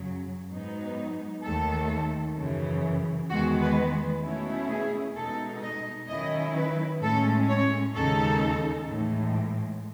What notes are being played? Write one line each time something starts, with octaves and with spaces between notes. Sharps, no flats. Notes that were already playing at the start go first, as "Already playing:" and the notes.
Already playing: F#2 C#3 F#3
G#2 F#3 B3 D#4
D#2 D#3 A3 A4
F#2 C#3 E3
E2 D#3 G#3 B3 F#4
B4
B2 A3 C#4 E4
G#4
B2 G#3 D#4 A4
D#5
D#3 F#3 C#4 E4 D#5
B4
A2 G#3 C#4 A4
C#5
D#2 C#3 G#3 D#4 A4
A2 E3 G#3